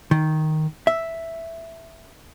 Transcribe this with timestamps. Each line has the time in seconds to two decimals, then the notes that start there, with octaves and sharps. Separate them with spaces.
0.11 D#3
0.87 E5